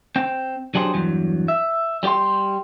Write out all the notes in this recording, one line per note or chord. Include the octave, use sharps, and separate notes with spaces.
C4 G5
F#3 D4 G4 G#4 C5
E2 G2 F#3
E5
G3 G4 C#5 G5 C6